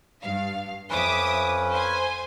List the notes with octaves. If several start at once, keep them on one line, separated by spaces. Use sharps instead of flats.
G2 F5
F2 C#4 B4 E5 D6 D#6
C5 G#5